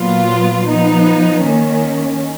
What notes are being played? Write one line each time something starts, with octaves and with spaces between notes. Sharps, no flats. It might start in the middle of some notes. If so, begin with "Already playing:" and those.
Already playing: A#2 F#3 B3 F4
F3 B3 D#4
D#3 A#3 C#4